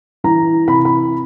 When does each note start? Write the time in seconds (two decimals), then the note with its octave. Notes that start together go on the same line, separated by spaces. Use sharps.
0.24 E3 A#5
0.67 C3 B5
0.85 B5